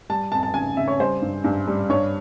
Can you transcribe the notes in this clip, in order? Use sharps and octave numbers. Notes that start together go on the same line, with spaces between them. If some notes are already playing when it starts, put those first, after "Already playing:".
G3 A5
F2 A5
A5
C#3 G#5
C#3 E5
C#5
G3 C5
G2
G2
G3
G2 C#5